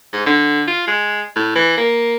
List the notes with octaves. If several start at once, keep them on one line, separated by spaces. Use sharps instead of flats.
G#2
D3
F4
G#3
A2
E3
A#3